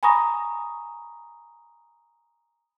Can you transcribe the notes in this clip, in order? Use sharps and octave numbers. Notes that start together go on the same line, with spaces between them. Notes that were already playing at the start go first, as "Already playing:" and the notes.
G#5 A#5 B5 C#6 D#6 A#6